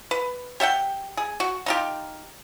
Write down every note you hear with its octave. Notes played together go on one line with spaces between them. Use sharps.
B4
G4 E5 F#5 G5
G#4
F#4
D#4 F4 G4